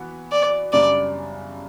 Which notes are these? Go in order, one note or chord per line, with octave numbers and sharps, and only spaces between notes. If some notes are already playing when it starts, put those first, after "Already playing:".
Already playing: E3 B3 F#4
D5
F#2 C#3 G3 D4 D5